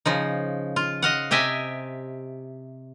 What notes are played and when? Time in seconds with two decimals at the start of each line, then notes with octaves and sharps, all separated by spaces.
0.06 C#3 F3 D#4
0.76 F4
1.02 D#5 F5 F#5
1.31 C3 G4 D#5 E5 G#5